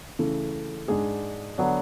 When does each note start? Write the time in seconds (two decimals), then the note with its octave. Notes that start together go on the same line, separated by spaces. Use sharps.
0.19 C#3 E3 A3
0.88 G#2 G#3 D4 G#4 D5
1.58 D3 F#3 B3 D4